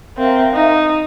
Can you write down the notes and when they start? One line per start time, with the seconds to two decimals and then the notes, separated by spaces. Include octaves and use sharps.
0.18 C4 A#4 E5 F5
0.54 D#4